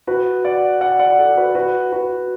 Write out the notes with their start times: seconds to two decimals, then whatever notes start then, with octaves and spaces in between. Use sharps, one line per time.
0.07 F#4 B4
0.45 D5 F#5
0.81 D5 F#5
0.99 D5 F#5
1.19 A4 D5
1.37 F#4 B4
1.55 F#4 B4
1.92 F#4 B4